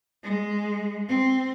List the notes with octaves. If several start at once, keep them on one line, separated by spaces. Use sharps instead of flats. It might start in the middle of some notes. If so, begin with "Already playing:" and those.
G#3
C4